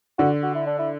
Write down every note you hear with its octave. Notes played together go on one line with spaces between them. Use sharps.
D3 F#4
F#4
E4
D4
E4